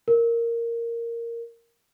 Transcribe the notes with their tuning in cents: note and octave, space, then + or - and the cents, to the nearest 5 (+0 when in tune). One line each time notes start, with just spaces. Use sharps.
A#4 -5